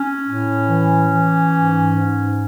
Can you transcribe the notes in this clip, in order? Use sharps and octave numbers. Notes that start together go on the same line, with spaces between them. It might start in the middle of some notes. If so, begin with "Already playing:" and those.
Already playing: C#4
A2
E3
E3
G#2
G#2